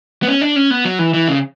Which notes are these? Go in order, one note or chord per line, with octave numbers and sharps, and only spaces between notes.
B3
C#4
D4
C#4
B3
F#3
E3
E3
C#3